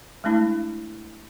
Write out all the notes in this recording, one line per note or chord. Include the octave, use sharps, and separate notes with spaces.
G#3 A3 D4 E4